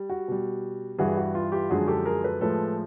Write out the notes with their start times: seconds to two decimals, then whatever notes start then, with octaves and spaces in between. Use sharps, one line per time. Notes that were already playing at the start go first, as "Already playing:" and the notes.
Already playing: G3
0.10 F#4
0.28 B2 G3
0.99 G2 E3 G3 F#4 G#4
1.17 F#4
1.35 F4
1.52 F4 G4
1.70 F#2 D3 F3 G#3 F#4 G#4
1.88 G4 A4
2.06 G#4 A#4
2.23 A4 B4
2.41 A2 F3 G#3 A4 B4